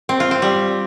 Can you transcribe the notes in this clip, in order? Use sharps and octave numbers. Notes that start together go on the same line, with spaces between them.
C4
F4
C4
G3